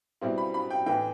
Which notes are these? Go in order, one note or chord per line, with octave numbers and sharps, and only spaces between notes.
B2 G3 C4 E4
B5
B5
G5
A2 E3 B3 D#4 G5